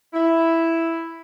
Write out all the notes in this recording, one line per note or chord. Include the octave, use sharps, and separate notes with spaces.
E4